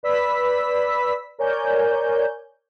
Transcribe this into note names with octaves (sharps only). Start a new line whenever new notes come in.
B4 D5 B5 E6 B6
A#4 C#5 D5 G#5 G6